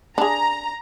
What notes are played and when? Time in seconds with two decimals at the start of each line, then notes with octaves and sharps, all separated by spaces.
0.18 D4 G#4 A#5